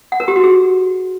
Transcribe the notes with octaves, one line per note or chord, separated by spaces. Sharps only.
F#5
A#4
G4
F#4
G#4